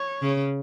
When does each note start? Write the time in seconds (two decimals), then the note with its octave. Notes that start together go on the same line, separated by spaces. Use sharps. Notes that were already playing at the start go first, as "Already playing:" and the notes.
Already playing: C#5
0.22 C#3